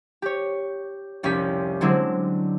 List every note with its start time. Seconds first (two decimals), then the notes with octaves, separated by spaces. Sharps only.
0.22 G4 C#5
1.23 F1 C2 C#4 G4 B6
1.81 D3 F#3 G#3 C4 D4 E4